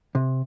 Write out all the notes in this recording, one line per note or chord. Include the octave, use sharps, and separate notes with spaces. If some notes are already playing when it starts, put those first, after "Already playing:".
C3